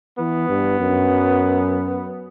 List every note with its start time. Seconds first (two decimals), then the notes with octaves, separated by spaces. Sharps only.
0.19 E3 B3
0.49 G2
0.80 F#2